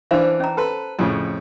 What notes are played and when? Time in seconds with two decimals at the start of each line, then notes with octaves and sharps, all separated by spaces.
0.11 E3 D4 B4 C5 F5
0.40 C#4 A#5
0.57 A4 B4
0.99 F2 A2 C#3